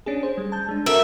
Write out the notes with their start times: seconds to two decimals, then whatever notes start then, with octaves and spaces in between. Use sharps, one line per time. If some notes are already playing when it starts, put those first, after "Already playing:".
0.06 C#4 D4 G#4
0.23 C5
0.37 G3
0.52 A5 G6
0.69 G#3 D4
0.86 F#4 A4 A#4 E5